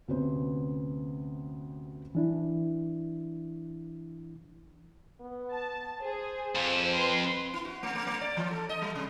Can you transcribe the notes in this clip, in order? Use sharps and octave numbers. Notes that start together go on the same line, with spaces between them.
D2 C3 B3 C#4 C5
E3 D4 E4
B3
A5
G#4 C5
F2
B4 C6
E4
F#4
A3
A3
A3
D5
E3
A4
D#5
G3
C3